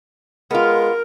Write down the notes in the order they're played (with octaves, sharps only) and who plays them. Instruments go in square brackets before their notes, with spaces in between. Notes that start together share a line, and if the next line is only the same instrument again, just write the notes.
[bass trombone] G#3 [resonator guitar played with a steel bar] B3 F4 [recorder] A#4